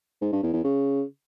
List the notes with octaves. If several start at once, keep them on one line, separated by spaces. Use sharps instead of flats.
G#2
G2
E2
E2
C#3